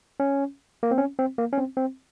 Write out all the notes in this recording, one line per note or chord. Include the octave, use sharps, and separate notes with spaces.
C#4
A#3
C4
C#4
C4
A#3
C#4
C4
C4